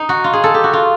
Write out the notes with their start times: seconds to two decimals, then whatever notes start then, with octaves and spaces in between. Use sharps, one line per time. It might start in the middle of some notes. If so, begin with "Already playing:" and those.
Already playing: D#4
0.09 F#4
0.24 F4
0.33 G#4
0.44 A4
0.54 G4
0.64 F#4
0.73 F4